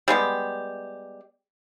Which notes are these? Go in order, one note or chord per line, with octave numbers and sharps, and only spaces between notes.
G3 G#3 B3 G4